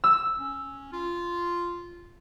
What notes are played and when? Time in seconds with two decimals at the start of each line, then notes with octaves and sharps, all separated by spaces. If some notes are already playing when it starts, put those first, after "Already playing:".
0.04 E6
0.37 C#4
0.92 F4